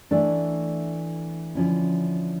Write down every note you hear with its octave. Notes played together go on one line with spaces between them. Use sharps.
E3 A3 D4
D3 F3 C#4 E4